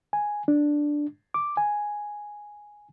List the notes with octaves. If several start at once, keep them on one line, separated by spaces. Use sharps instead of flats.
G#5
D4
D6
G#5